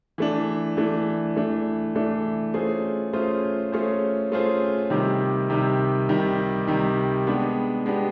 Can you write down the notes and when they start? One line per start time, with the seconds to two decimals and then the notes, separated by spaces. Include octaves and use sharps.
0.18 E3 A3 D4
0.77 E3 A3 D4
1.36 E3 A3 D4
1.95 E3 A3 D4
2.54 A3 C#4 F4 G#4 C5
3.13 A3 C#4 F4 G#4 C5
3.72 A3 C#4 F4 G#4 C5
4.32 A3 C#4 F4 G#4 C5
4.90 C3 D#3 G3
5.50 C3 D#3 G3
6.09 C3 D#3 G3
6.67 C3 D#3 G3
7.27 G#3 B3 D4 G4
7.86 G#3 B3 D4 G4